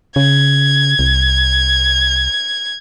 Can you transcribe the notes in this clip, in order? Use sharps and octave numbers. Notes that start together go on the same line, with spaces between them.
C#3 G#6
C2